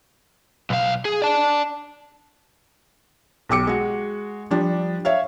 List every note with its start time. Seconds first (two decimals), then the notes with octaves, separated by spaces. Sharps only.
0.70 B1 F5
1.05 G#4
1.22 D5 A5
3.49 B1 G4 D6 C#7
3.67 G#3 F#4
4.51 F3 G3 D4
5.05 C#5 E5 F5